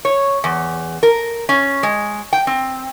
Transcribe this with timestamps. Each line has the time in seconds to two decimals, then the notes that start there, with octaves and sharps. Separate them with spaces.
0.05 C#5
0.44 E2
1.03 A#4
1.49 C#4
1.83 G#3
2.33 G5
2.47 C4